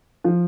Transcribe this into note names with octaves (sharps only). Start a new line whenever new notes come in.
F3